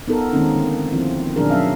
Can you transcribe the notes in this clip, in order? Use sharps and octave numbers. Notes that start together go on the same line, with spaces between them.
B3 D#4 F4 A4 A#4
D#3 G#3 A#3 C4 C#4 D#4
D3
F3 C4 E4 F4
B2 D#3 F#3 D4 G#4 A#4
F#3 C#4 E5 F5